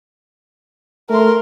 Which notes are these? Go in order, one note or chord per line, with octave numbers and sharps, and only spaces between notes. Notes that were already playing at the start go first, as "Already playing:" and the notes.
A3 A#4 C6